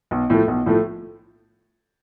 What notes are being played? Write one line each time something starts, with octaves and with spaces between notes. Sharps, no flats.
B1
A2 F3 A3
B1
A2 F3 A3